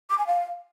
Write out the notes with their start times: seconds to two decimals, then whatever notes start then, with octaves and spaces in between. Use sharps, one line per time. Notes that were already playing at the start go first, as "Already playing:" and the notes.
0.10 D6
0.18 G#5
0.27 F5